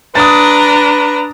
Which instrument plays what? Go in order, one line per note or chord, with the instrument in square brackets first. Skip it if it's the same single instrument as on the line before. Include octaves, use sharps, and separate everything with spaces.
[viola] D4 A#5 [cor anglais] B4 [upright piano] D#6 A6